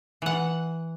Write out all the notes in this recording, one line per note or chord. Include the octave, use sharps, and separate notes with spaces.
E3 F#5